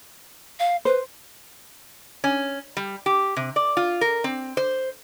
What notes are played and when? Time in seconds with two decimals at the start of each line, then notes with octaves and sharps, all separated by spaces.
0.59 F5
0.85 B4 C5
2.24 C#4
2.77 G3
3.06 G4
3.37 C3
3.56 D5
3.77 F4
4.01 A#4
4.24 C4
4.57 C5